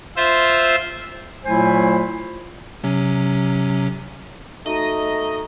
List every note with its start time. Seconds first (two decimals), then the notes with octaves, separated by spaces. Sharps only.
0.16 F4 C5 E5
1.44 A#2 F#3 A3 E4 C5 G#5
2.84 C3 F#3 C#4
4.66 A3 D#4 F#4 D#5 A#5